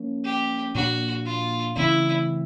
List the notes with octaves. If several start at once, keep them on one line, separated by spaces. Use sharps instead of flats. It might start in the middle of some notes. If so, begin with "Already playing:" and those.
Already playing: F3 A#3 C#4
G4
A#2 F3 A#3 D4 F#4
F4
C#3 E3 A3 C4 E4